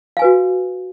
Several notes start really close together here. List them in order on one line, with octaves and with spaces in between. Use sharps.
F5 G#5 B4 F#4